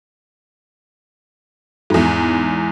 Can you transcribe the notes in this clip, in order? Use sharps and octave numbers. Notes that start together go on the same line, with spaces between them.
E2 G#2